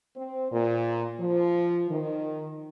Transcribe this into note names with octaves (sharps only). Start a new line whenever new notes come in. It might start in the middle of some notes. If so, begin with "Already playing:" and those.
C4
A#2
F3
D#3